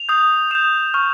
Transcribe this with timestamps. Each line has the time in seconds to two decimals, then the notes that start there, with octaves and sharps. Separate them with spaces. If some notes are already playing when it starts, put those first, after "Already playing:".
Already playing: F7
0.09 D#6 G6
0.51 D#6 G6 E7
0.94 C#6 F6